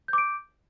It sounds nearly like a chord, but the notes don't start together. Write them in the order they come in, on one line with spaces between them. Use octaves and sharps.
G6 D6 D7